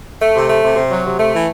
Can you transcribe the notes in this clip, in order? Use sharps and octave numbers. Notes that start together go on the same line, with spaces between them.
A3
C3
A3
C3
C3
F#3
C3
A3
E3